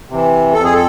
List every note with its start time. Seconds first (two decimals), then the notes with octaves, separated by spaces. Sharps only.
0.09 C3 E3
0.53 F2 A4
0.64 G#4
0.73 A4